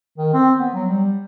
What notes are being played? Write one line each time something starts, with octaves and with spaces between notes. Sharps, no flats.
D#3
C4
B3
F#3
G3